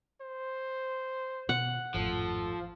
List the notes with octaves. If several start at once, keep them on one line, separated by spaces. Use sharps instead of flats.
C5
B2 F#5
G#1 F2 A2 F3 A4